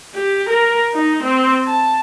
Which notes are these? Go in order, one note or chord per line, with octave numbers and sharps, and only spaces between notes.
G4
A#4
D#4
C4
A5